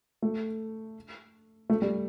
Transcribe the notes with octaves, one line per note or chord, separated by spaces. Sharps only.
A3
A3
G3